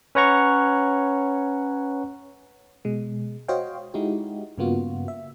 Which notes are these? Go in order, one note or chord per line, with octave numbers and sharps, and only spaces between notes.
C#4 B4 C#5 F#5 A#5 C#6
B2 G#3
F#4 C5 C#5 D#5 F5 G5
G#3 D#4 E4 F#4 G4
G2 C#3 A#3 B3 F4 F#4
E5